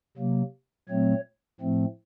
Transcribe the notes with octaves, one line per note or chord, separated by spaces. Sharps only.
C3 F#3 A#3
A#2 F#3 A3 C4 C#5
A2 F3 A3 C4